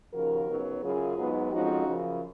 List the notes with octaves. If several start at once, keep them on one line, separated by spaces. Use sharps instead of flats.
D#2 C#3 F3 F#4 A#4
C#3 F#3 B3 D#4
F#2 C#3 F#3 C#4 F4 G#4
G#2 F#3 B3 D#4
F2 F3 G#3 C#4 D#4 F#4
F#2 C#3 F3